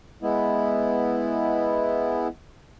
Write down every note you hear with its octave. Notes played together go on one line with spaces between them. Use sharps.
G#3 B3 E4